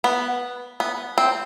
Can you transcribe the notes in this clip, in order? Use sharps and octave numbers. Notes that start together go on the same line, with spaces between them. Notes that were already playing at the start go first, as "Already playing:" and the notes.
B3
B3
C4